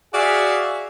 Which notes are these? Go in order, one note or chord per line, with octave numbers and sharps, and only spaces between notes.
F#4 G#4 D5 E5 F5